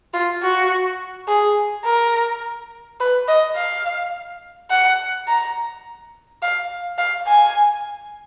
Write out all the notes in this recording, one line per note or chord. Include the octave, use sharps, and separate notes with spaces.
F4
F#4
G#4
A#4
B4
D#5
F5
F#5
A#5
F5
F5
G#5